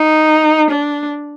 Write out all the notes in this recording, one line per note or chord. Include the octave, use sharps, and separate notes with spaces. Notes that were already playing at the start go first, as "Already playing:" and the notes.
Already playing: D#4
D4